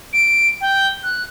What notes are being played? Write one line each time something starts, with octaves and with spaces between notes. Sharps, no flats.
D7
G5
F#6